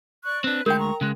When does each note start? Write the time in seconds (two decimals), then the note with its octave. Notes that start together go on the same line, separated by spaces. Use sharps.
0.25 D5 C#6 F#6
0.44 C4 D4 B4 F#6
0.66 D2 G#3 E4 A#4 G5 C6 G6
0.79 A#5 C#6
1.01 C#3 G#3 F#6